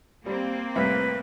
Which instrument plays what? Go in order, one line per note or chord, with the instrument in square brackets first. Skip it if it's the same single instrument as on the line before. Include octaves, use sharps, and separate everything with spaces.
[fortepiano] G3 [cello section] A#3 C4
[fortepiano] C2 A2 E5 [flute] B4